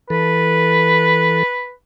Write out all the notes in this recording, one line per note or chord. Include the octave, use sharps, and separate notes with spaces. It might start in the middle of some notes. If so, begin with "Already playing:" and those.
E3 A4 B4